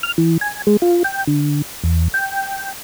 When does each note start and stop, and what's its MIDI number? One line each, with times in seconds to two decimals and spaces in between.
0.03 0.12 89
0.18 0.37 52
0.41 0.62 80
0.67 0.77 56
0.82 1.03 65
1.04 1.24 79
1.27 1.62 50
1.84 2.08 40
2.14 2.73 79